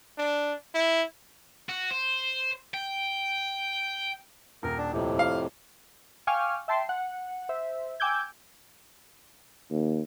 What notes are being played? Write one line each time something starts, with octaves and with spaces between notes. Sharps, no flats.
D4
E4
F#4
C5
G5
D#1 A#4
D4
F2 A2 C3
F5
F5 G5 G#5 C#6 D6 F6
E5 G5 A5 C6 C7
F#5
C5 E5
G5 G#5 D6 E6 G6 G#6
D#2